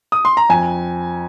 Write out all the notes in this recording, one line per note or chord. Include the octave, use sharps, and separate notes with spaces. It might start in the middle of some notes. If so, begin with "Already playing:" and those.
D#6
C6
A#5
F2 G#5